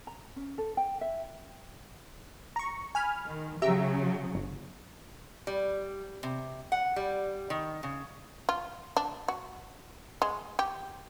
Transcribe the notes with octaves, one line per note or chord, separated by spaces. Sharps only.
A#5
C#4
A4
G5
E5
A#5 C#6
G#5 B5 F6
D#3
C#3 F#3 G4 E5 A#5
G1
G3
C3
F#5
G3
D#3
C#3
F4
D4
F#4
G#3
G4